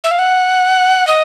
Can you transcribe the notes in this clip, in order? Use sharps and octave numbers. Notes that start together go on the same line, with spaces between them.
E5
F5
F#5
D#5